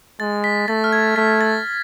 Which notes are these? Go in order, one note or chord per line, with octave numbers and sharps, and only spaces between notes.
G#3 A6
B6
A3 A6
F6
G#6
A3 B6
A6